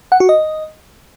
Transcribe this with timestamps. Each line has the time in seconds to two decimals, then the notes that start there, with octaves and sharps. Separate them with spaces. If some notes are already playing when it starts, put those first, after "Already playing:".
0.12 F#5
0.20 F#4
0.29 D#5